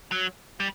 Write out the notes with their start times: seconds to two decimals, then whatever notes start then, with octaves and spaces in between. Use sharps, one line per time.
0.12 F#3
0.60 G3